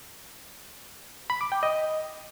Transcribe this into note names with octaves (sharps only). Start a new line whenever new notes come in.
B5
D6
G5
D#5